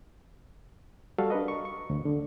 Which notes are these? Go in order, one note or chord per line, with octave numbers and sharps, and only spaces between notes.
G3 F#4 A4 F5
D4 A#4 B4 D#5
C#6
C#6
D2
D3